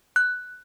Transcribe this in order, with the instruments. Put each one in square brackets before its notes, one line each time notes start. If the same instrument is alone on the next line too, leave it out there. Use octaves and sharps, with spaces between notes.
[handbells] F#6